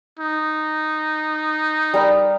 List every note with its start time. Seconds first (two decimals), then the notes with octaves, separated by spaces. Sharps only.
0.19 D#4
1.94 G3 A#4 A#5